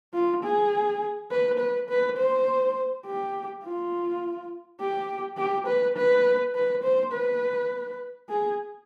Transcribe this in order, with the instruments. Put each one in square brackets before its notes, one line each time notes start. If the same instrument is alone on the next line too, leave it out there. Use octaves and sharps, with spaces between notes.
[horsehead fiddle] F4
G#4
B4
B4
B4
C5
G4
F4
G4
G4
B4
B4
B4
C5
B4
G#4